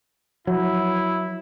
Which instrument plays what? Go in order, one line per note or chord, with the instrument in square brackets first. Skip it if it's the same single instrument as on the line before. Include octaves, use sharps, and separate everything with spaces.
[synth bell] F3 [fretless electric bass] F#3 [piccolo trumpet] E4